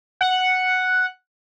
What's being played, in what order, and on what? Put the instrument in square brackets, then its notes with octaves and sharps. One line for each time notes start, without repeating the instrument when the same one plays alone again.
[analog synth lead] F#5